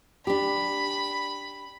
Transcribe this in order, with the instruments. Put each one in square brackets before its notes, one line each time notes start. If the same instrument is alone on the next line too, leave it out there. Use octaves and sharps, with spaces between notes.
[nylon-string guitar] D4 G4 [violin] B5